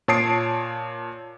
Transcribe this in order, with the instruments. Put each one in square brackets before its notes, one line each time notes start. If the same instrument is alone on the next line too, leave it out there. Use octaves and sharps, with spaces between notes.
[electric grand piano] A#2 C#5 A5 D#6 C7 D7